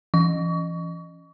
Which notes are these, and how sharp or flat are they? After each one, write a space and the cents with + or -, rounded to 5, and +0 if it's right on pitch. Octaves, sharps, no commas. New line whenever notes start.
E3 +35 C#6 +35